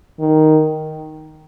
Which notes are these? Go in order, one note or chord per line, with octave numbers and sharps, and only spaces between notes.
D#3